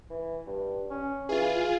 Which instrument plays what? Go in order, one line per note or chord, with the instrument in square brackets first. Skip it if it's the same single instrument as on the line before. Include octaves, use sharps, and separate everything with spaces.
[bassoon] E3
G2
C#4
[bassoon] E3 [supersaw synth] F4 G#4